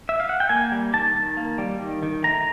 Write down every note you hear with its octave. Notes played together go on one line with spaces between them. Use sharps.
E5
F5
F#5
G5
A#3 G#5
G3
D#3 A5
D#3
A#3
G3
D#3
D#3
A3 A#5